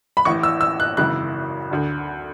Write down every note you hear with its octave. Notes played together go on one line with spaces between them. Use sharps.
B5
A1 A2 E3 C#6
E6
E6
F#6
G#1 F#2 C#3 E3 F#6
D2 D3